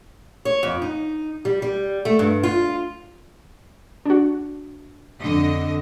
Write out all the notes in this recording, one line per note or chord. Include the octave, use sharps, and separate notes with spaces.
C#5
F2
D#4
G3
G3
A3
G2
F4
D4 F#4
F2 D3 D#5